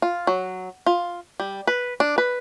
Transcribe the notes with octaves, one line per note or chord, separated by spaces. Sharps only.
F4
F#3
F4
G3
B4
D4
B4